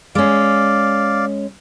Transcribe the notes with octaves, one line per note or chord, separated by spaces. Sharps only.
G#3 C#4 D5 F5